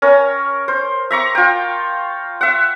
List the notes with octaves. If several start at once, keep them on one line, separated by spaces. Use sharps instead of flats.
C#4 A#4
C5
E5 A#5 C#6 D6
F4 G5
E5 F#5